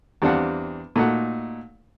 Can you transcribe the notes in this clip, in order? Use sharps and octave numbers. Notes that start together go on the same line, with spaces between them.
E2 G3 C4 D4 F5 F#5
A#2 A3 D#4 F#4 F#5